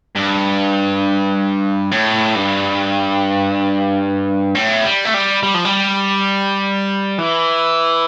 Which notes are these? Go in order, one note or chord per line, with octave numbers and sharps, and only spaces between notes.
G2
A2
G2
A2
G3
A3
G3
G3
F3
G3
E3